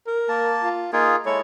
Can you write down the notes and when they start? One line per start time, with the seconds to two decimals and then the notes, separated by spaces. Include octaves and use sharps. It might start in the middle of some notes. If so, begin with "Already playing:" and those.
0.07 A#4
0.29 A#3 A5
0.63 F4
0.93 A#3 D#4 F4 G#4
1.26 G#3 E4 A4 C#5